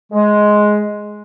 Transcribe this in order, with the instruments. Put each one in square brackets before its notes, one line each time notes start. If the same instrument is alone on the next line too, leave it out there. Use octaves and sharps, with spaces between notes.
[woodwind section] G#3